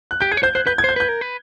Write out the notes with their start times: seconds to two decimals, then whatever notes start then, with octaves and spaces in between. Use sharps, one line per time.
0.11 F#6
0.21 G4 G6
0.32 G#4 G#6
0.37 C#5
0.43 C5 G6
0.55 C5 F#6
0.66 B4 G6
0.78 G#6
0.84 C5 G6
0.96 B4 G6
1.09 A#4
1.21 B4